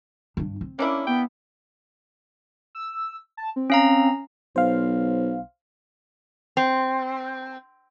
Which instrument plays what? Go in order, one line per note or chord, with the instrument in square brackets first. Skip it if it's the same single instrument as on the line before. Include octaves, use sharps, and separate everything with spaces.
[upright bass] G2 D4
C4
[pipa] A#3 D4 E4 [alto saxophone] C#4
[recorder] B3 [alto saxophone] G5
[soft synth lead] E6
A5
C4
[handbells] C#4 F5 A#5
[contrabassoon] B1 [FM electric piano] C5 F5
[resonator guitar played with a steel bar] C4